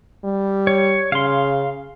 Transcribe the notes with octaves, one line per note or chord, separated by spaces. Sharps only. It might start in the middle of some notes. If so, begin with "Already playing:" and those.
G3
C#5
C#3 F5 C6